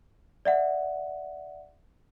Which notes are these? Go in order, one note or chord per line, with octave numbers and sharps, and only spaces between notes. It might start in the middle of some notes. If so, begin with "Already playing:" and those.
D5 E5 F#5